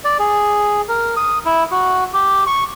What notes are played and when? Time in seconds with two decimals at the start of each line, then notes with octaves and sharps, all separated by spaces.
0.04 D5
0.19 G#4
0.88 A#4
1.17 D#6
1.45 E4
1.71 F#4
2.13 G4
2.47 C#6